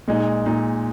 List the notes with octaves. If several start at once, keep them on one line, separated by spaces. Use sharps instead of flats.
A#2 G#3 D#4
A#2 G#3 D#4